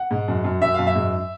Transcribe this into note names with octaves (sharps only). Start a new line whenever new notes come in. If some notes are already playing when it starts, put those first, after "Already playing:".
Already playing: F#5
G#2
F#2
F#2
F#2 E5
F#2 F5
E5
G#2